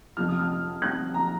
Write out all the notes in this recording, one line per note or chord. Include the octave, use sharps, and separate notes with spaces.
F2 C3 F3 F6
D#6
F6
F#6
A#5